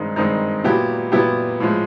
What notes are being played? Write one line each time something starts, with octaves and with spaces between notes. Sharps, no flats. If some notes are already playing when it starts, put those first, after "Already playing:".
Already playing: G2 D#3 G#3 C4 D#4
G2 D#3 G#3 C4 D#4
A#2 F#3 B3 E4 G4
A#2 F#3 B3 E4 G4
A2 F3 G#3